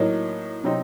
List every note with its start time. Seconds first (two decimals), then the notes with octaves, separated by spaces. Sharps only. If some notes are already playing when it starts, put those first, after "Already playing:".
Already playing: A2 F#3 A#3 D#4
0.64 C3 F#3 C4 D#4